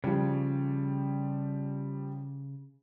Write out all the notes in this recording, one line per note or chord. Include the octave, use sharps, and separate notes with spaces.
C#3 F3 G3